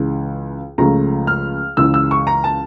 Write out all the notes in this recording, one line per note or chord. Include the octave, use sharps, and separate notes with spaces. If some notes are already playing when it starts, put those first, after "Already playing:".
Already playing: C#2 C#3 E3
C#2 C#3 F3 A3 A#5
F6
C#2 C#3 E3 E6
E6
C#6
A#5
A5